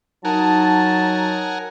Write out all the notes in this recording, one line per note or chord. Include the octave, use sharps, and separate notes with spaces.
F#3 D#4 A#4 F#5 G#5 A5